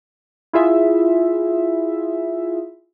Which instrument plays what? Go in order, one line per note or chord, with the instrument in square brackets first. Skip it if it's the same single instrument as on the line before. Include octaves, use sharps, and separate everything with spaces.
[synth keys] E4 F4 G#4 E5